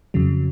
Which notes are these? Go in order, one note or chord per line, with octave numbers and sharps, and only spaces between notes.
F2 C#3 F#3